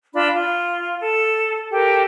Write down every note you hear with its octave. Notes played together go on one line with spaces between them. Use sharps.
D4 F4 B5
F4
A4
G4 A4 A#4